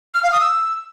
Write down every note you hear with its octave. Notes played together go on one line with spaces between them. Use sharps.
F6
F5
D#6
E6